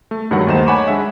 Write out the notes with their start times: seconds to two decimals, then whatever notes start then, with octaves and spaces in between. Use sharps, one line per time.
0.11 A3
0.31 G2 D#3 F#3 G#3 F#5
0.47 D#2 A3 D#4 C5 E7
0.66 C#5 F#5 G#5 B5 C#6 D6
0.88 G#3 D4 E5